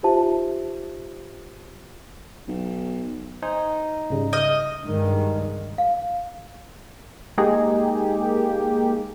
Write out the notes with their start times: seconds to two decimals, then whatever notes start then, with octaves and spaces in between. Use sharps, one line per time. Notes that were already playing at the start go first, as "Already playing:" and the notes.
0.03 D#4 F4 G4 C5 E5 A5
2.48 B1
3.42 D#4 C5 G#5
4.10 G#2 C#3 G3
4.33 D#5 D#6 F6 G6
4.84 G2 D#3 G#3
5.78 F5
7.38 G#3 A#3 D#4 G4 G#4